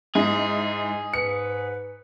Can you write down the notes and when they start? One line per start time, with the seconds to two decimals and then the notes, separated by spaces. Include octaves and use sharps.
0.15 G#2 E4 G#4
1.14 G#2 B4 C#7